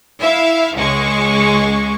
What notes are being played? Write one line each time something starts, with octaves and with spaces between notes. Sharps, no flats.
E4 E5 F5
C#2 G#3 C#6